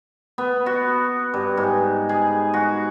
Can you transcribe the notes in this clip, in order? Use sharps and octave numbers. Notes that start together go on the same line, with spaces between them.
B3
F#4
G2
G#2
G#4
F#4